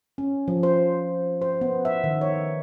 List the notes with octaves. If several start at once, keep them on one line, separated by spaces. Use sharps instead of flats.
C#4
F3
C5
C5
B3
E5
D#3
C#5